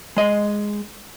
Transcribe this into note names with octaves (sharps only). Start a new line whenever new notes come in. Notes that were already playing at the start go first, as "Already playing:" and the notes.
G#3 D#5